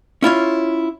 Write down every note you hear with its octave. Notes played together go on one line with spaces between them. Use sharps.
C#4 E4 F4 C#5